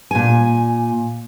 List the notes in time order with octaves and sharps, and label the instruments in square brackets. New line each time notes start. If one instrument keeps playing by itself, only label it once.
[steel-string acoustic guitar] A#2 G#5